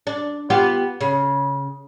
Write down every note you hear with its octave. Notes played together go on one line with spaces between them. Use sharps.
D4
B3 F4 G4
C#3